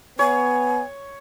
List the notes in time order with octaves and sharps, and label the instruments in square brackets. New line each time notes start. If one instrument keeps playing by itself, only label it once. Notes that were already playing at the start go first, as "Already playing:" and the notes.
[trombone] B3 [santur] C#5 [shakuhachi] G#5